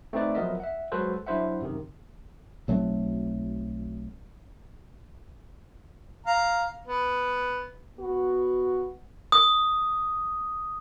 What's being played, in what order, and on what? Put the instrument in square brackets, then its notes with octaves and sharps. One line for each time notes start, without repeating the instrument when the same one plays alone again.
[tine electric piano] A3 C4 D#4 B4 D5
F3 F#3 B3 A#4 D#5 E5
E5 F#5
F#3 G#3 F#4 A4 B4 C5
F#3 D4 E4 C5 E5 F#5
F#2 C3 D#3
[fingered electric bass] B1 F#3 A3 C4
[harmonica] F5 A#5
B3
[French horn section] B3 F#4
[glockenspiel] D#6